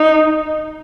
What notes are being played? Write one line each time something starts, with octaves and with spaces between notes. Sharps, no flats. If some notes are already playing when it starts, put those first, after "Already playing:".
Already playing: D#4